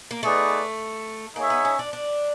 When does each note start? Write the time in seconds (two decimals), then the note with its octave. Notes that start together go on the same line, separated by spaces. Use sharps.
0.11 A#3
0.23 A3 B3 D#4 G#4 B4 D5
1.36 A#3 D#4 G#4 C#5 E5
1.50 B3
1.65 C#4
1.79 D4
1.93 D4